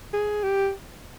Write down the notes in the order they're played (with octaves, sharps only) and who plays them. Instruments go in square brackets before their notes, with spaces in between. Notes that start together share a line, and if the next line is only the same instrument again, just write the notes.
[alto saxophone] G#4
G4